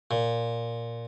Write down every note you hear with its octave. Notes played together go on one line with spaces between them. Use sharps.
A#2